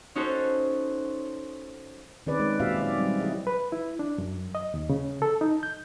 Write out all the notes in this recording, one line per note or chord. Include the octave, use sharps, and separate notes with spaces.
C#4 D#4 F#4 A4 C5
D#3 C4 C#4 G#4 B4 D5
G#3 B4
A#2 C4 F#4 G4 E5 F5
F#3 D5
G3 C4
F#3 E4 F#4 G#4 D#5
B4
E4
D4
F#2
D#5
D#2
C#3
A4
D#4
G6